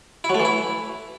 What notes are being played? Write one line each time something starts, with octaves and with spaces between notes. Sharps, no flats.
E4
F#3
A3
E3
E4